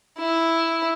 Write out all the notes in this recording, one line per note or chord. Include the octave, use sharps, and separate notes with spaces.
E4